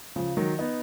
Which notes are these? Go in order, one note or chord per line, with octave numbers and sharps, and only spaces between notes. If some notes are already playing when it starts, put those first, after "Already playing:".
C#3 F3
D#3 F#3
B3 D#4